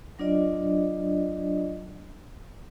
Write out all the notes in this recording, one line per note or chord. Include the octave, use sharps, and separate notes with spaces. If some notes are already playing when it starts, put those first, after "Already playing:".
F#3 D4 F4 D5 D#5